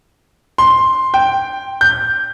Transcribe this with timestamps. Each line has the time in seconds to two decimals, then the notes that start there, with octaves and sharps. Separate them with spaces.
0.58 C6
1.14 G5
1.81 G6